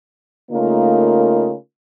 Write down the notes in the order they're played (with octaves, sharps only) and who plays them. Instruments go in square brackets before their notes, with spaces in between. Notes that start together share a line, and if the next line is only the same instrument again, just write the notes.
[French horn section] C#3 A3 A#3 D#4 F4 A#4